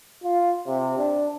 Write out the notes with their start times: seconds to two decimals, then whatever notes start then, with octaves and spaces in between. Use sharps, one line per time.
0.23 F4
0.66 C3
0.98 D4